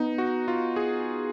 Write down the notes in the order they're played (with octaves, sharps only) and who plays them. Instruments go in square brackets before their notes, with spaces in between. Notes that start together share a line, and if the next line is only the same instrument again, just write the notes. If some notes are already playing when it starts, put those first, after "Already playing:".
Already playing: [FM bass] B3 [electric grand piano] D#4
[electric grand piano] F#4
F4
G#4